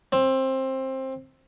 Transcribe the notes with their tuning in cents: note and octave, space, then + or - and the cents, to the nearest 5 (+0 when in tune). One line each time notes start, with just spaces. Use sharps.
C4 +20